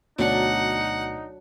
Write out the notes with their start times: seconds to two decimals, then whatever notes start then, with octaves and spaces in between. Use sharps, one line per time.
0.19 D2 B2 F#3 D4 D#4 F#5